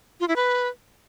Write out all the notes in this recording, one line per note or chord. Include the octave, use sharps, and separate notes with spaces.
F4
E4
B4